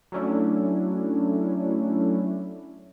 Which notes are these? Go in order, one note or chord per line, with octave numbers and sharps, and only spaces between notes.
F#3 A3 C#4 D4 E4